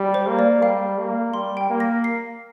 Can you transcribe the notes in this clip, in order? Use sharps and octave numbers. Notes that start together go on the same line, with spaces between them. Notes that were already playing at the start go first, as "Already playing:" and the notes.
Already playing: G3
C5
A#3
D5
G3 F5
A#3
G3 C6
G5
A#3
A#6
C7